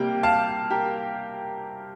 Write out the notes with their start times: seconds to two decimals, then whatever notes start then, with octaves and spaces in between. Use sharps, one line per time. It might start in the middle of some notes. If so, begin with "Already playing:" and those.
Already playing: C3 G3 A#3 G5
0.23 F5 A5
0.70 G4 A#4